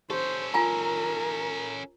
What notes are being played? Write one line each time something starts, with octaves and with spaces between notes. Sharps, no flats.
C#4 G4 A4 C5
F4 A#4 G#5 A#5